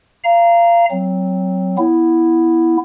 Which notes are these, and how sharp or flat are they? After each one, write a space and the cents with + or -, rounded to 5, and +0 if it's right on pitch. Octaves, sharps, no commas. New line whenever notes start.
F5 -25 A#5 +0
F#3 +5 C4 +0
B3 -10 E4 +0